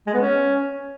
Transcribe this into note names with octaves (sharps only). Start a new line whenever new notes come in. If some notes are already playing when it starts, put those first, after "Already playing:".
G#3
B3
C#4